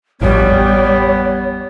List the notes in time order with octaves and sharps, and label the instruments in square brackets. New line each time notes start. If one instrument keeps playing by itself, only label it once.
[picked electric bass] A1 F2 [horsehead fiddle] G3 [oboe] B3 [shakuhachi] C#5